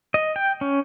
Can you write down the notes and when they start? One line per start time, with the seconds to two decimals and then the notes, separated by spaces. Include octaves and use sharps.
0.14 D#5
0.36 G5
0.61 C#4